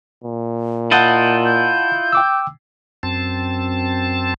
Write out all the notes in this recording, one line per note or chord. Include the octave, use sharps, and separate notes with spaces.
A#2
E4 F4 D#5 F#5 A5 G6 A6
G6
G5 D6 E6
F#2 C4 A5